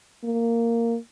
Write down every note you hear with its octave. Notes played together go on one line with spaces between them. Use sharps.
A#3